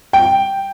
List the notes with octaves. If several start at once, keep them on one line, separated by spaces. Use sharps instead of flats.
G5